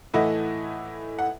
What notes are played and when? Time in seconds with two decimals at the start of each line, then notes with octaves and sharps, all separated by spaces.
0.14 A2 E3 A3 E4 D#5 F#5
1.19 F#5